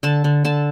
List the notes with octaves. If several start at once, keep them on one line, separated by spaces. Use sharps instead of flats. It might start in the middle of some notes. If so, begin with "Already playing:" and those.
D3 A5
D3
D3 A5